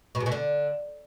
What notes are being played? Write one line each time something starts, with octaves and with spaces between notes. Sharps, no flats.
B2
G#2
B2
D3